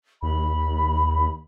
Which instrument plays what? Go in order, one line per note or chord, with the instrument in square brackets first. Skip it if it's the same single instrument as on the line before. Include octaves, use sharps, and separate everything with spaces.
[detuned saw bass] D#2 [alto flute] B5